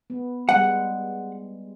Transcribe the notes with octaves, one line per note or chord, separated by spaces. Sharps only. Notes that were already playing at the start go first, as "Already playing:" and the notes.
B3
G3 G#3 F#5